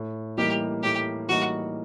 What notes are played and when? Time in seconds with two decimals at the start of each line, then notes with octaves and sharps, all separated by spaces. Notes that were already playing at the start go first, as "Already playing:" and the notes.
Already playing: A2
0.38 E3 G3 A#3 D#4 G4
0.83 A2 G4
1.29 E3 G3 A#3 D#4 F#4